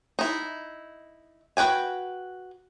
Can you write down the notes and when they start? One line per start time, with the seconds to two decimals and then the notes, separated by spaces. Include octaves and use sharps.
0.19 D#4 E4
1.57 F#4 B4 G5 G#5